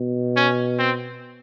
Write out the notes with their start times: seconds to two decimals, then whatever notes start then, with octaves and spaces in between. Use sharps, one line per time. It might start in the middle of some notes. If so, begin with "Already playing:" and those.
Already playing: B2
0.36 C#4
0.79 C4